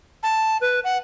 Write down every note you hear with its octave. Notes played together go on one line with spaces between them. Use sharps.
A5
B4
F#5